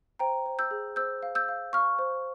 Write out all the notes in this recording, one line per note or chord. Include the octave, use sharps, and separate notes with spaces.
C5 G5 A#5
C5
E6 G6
G#4
C5 E6 G6
F5
E6 G6
F5
F5 C#6 F6
C5